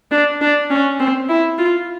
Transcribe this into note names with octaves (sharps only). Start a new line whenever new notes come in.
D4
D4
C#4
C4
E4
F4